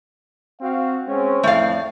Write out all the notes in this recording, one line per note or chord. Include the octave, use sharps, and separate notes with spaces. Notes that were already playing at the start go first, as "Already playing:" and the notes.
C4 F#4 F5
G#3 C4 C#4
F2 A2 A3 D5 F5